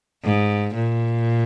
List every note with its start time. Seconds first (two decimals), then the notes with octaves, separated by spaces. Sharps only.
0.24 G#2
0.75 A#2